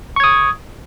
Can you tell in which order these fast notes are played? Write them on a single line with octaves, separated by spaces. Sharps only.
C#6 G#6 D#6